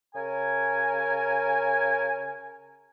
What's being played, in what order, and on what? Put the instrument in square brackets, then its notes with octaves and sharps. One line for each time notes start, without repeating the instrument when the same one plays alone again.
[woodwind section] C#3 A#4 G#5